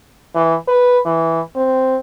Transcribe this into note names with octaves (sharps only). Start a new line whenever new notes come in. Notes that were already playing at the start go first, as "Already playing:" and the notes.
E3
B4
E3
C4